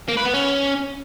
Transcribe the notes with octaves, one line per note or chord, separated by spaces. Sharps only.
A#3
B4
B3
C#4